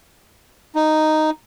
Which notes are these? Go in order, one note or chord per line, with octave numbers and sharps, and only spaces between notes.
D#4